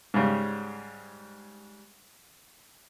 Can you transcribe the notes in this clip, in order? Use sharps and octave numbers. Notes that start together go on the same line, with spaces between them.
G#2 C#3 G3